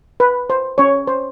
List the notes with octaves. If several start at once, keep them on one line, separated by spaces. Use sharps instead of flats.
B4
C5
C#4 C#5
C5